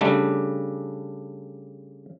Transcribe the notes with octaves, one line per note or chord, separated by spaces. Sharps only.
C#3 G3 A3 D4